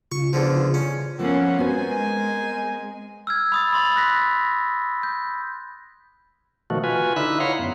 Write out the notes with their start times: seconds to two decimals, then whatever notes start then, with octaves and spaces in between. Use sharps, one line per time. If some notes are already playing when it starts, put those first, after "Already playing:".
0.12 C#3 F4 C#6
0.33 E2 D3 F3
0.74 C#4
1.19 F3 A#3 B3 C#4 F4 A4 F#5
1.58 G#3 B3 C4 F#4 A#4 C5 G#5
3.27 E6 F6 G#6
3.52 B5 D#6 A6
3.73 B5 C6 A6
3.96 F#6 A#6 B6
5.03 G6
6.70 B2 D#3 F3 A3 F#4
6.84 F4 F#4 B4 G#5
7.16 D3 D#4 E4 E5 B5 F#6
7.40 C#5 F5 F#5 A#5 C6
7.59 F#2 B3